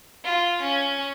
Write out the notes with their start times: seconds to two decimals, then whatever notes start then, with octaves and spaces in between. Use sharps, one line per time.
0.24 F4
0.61 C#4